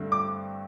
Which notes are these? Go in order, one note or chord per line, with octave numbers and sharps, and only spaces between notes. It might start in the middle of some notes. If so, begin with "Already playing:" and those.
Already playing: G2 D3 A3 C4
D6